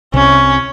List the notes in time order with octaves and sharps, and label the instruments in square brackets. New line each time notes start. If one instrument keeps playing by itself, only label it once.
[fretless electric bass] C2 C3 [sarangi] C#4